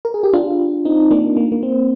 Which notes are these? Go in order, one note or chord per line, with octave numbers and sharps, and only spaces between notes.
A#4
G#4
G4
D4 F4
C4 D#4
A#3 D4
A#3
A#3
C4